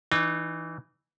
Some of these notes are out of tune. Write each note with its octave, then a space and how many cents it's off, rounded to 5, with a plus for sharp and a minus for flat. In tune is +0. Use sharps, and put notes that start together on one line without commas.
E3 -5 D#4 -35